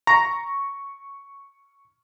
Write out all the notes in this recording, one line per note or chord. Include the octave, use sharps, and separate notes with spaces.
A#5 C#6